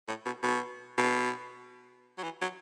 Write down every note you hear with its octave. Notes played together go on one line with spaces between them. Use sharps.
A2
B2
B2
B2
F#3
E3
F#3